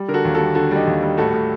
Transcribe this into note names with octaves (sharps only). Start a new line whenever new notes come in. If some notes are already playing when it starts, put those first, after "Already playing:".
Already playing: G3
D3 A#4
F#4 A4
D#2
F#4 A4
G3
D3 F#4 A4
G3 D#4 G4
D#2
G3
A2 F#4 A4
A2